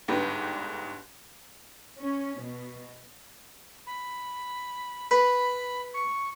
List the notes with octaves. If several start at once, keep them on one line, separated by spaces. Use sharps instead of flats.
G1 G#2 D3 G4 B4
C#4
B2
B5
B4 B5
C#6